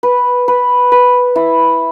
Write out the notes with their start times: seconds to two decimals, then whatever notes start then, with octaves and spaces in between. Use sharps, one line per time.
0.03 B4
0.48 B4
0.92 B4
1.36 E4